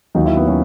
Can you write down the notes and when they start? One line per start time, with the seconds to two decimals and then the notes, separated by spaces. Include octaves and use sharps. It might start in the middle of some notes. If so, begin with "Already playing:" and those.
0.15 D#2 D#3 F#3 D#4
0.26 E4
0.37 B3
0.48 F#3 C#4